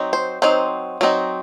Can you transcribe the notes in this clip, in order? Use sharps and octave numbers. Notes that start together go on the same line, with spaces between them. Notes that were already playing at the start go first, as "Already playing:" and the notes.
Already playing: F#3 C4 D#4
C5
F#3 C4 D#4 C5
F#3 C4 D#4